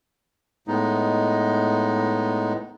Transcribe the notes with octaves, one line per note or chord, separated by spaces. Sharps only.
A2 G#3 B3 D#4